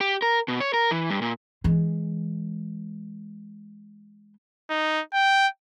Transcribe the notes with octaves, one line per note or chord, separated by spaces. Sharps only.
G4
A#4
B2
C#5
A#4
E3
G2
A#2
E3 G#3
D#4
G5